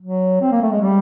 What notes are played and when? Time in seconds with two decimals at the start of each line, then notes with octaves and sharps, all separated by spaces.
0.02 F#3
0.41 C4
0.51 A#3
0.62 A3
0.72 G#3
0.81 G3